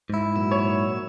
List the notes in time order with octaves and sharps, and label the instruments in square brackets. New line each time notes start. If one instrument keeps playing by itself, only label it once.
[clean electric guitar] G#2 E4
[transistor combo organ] A#2 F#3 E6
[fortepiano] C#5